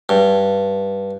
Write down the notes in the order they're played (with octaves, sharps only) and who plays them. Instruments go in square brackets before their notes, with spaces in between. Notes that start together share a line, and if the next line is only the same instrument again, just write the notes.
[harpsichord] G2